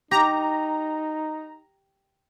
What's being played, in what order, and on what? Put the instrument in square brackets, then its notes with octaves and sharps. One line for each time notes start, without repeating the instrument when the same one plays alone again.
[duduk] D#4 [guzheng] G4 [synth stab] A#5